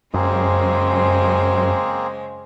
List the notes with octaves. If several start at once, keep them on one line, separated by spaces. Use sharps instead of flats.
F#2 C#3 G#3 A#3 C4 G#4 C5